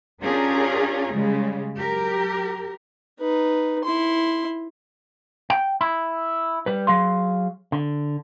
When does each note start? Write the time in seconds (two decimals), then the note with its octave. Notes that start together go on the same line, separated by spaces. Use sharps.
0.22 C#4 D4 F4 G4 G#4 A#4
1.13 C#3 G3 G#3
1.75 F#3 G4 A#4
3.20 D#4 B4
3.84 E4 C6
5.50 G5
5.81 E4
6.66 G3 B4
6.87 F#3 G#4 F5 C6
7.72 D3